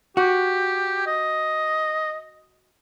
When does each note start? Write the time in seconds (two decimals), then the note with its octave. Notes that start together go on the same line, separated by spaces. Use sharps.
0.17 F#4 G4
1.06 D#5